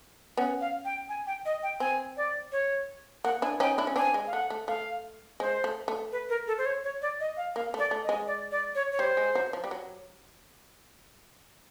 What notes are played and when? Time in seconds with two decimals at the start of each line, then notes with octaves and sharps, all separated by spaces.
0.37 B3 C#4 F#5
0.61 F5
0.85 G5
1.09 G#5
1.27 G5
1.46 D#5
1.63 G5
1.80 C4 G#5
2.17 D5
2.52 C#5
3.24 A#3 F#5
3.42 D4 E4 G#5
3.60 C#4 D#4 G5
3.78 D4 E4
3.87 C#4
3.96 C4 D4 G#5
4.14 G#3
4.27 F5
4.33 A3 F#5
4.50 A3
4.68 A3 F5
5.40 G#3 C5
5.64 A3
5.88 A3
6.12 B4
6.29 A#4
6.47 A4
6.58 C5
6.66 C#5
6.84 C#5
7.02 D5
7.20 D#5
7.37 F5
7.56 A#3 F5
7.74 A3 D5
7.91 A3
8.04 D#5
8.09 G#3
8.27 D5
8.51 D5
8.75 C#5
8.92 C#5
8.99 G3 C5
9.17 G#3
9.35 F#3
9.53 F3
9.64 G3
9.71 F#3